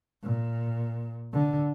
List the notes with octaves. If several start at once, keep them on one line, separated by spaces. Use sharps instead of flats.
A#2
D3